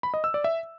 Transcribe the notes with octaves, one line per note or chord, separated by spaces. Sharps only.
B5
D#5
E6
D5
E5